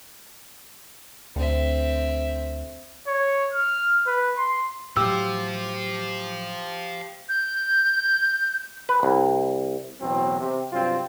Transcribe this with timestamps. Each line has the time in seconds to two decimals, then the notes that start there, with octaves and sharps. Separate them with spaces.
1.36 D2 C4 E5
3.07 C#5
3.53 F6
4.07 B4
4.37 C6
4.97 A2 F#3 G4 C5 F5 E6
7.29 G6
8.89 B4
9.03 C2
10.01 A1 E2 B2 F#3 C4
10.40 C3
10.73 G2 C3 F#3 C4 F4